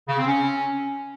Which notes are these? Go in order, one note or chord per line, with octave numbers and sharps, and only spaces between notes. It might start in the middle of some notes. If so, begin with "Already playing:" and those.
C#3
C4
C#4